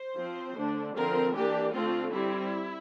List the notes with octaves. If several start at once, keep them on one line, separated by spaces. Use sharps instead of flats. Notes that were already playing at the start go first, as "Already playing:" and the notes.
Already playing: C5
F3 C4
D3 A3 D4
D3 F3 C4 A#4
E3 A#3 D4 G4
D3 A3 C4 F4
G3 C4 E4